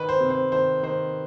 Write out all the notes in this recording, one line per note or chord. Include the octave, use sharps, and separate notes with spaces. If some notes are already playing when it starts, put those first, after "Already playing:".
Already playing: D#3 B4
C5
C3
C5
D#3 C5
D#3 C5